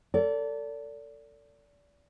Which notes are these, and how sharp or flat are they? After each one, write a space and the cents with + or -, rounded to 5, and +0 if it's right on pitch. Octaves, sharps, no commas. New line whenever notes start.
A4 +35 D5 -30